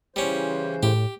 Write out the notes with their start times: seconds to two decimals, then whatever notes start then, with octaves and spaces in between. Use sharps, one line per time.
0.16 C#3 E3 G3 C#4 C5
0.83 A2 G4